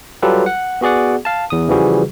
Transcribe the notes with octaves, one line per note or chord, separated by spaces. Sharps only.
F#3 G3 F4 G4 A4 B4
F#5
B3 F#4 G#4 D5 F#5
F5 A5
E2 D#6
C#3 E3 F3 G3 F#4 G#4